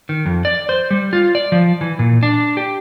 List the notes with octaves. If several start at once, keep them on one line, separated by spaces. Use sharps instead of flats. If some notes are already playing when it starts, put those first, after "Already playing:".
D#3
F2
D5
C5
G3
F4
D5
F3
E3
A#2
D4
G4